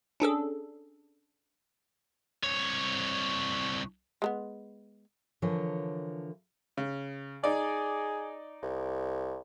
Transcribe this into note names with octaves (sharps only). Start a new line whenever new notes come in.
C#4 D4 G#4 A4
C2 C#5
G#3 A3 B3
D3 E3 F3 A#4 C#5
C#3
D#4 G#4 D5
C2